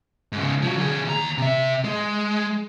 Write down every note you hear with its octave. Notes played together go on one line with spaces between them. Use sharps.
G#2 C#3
F3 F#3
D3 G#4
D#2 A#5
C3 E5
G#3